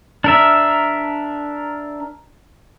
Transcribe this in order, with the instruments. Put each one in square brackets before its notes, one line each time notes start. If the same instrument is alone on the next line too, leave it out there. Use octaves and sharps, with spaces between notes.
[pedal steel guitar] D4 A#4 E5